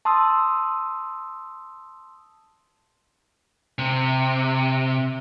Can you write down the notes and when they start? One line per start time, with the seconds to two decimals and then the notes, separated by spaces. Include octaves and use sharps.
0.05 A5 C6 D#6 E6
3.79 C3